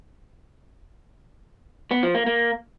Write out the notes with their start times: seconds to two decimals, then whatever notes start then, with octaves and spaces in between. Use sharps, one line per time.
1.91 B3
2.03 F3
2.15 A#3
2.26 A#3